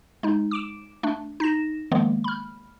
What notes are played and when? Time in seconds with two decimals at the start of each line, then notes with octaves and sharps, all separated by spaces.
0.23 G#3 D#4
0.51 D6 D7 E7
1.03 A3 D4
1.40 D#4 A#6 E7
1.91 D#3 F3 G#3 A#3 B3
2.24 B5 F6